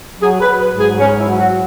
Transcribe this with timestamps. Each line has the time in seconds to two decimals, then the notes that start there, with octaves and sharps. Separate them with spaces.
0.20 F#3 G#4
0.41 B4
0.47 F#3
0.60 B4
0.73 G#2
0.80 G#4
0.99 G#2 C#4
1.19 E4
1.26 F#3
1.39 F#4